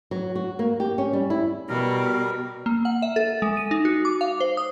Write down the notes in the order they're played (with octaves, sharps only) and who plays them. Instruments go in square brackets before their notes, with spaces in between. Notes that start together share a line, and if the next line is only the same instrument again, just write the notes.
[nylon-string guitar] F#3
F#4
A#3
G4
C#4
G3
E4
[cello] B2 [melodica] G3 A#4
[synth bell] A#3
F#5
E5
A4
G#3
D#7
D#4
F#4
D6
F5
C5
D#6